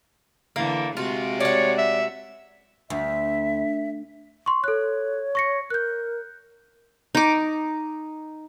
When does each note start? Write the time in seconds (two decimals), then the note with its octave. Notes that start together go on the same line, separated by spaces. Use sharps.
0.56 D3 E3 A#3
0.97 C3 G#3 F4 F#4
1.40 C#5 D5 F#5
1.78 E5
2.90 D2 E5
4.46 C6 C#6
4.64 A4 C#5 F#6
5.35 C#6 A#6 C#7
5.70 A#4 F#6 G6
7.15 D#4 D6